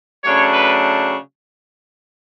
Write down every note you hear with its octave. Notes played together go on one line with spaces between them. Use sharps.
C#3 F#3 A3 D4 C#5
B4